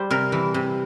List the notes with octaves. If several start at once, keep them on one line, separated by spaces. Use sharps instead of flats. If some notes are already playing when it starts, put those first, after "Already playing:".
Already playing: G3 C5
C3 A#4
E3
C3